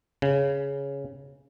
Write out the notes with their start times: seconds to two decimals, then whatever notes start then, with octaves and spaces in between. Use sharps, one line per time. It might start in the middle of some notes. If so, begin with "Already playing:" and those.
0.22 C#3